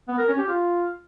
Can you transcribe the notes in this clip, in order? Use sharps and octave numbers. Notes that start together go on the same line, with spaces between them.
B3
A#4
C#4
G4
F4